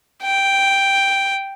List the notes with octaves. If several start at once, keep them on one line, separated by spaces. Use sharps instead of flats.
G5